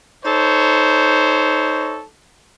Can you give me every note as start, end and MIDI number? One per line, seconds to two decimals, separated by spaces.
0.25 2.02 63
0.25 2.02 69
0.25 2.02 72
0.25 2.02 73